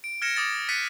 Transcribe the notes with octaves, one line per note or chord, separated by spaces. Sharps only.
D7
F6 G#6 A#6 C#7 E7
D6 D#6 A6
F#6 A6 B6 C#7 D#7